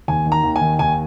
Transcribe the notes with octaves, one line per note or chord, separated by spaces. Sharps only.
D#2 G#5
D#3
A#5
D#2
G#5
D#3
D#2 G#5